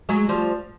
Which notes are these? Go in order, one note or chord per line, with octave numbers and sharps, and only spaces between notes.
F#3 G#3
F3 G3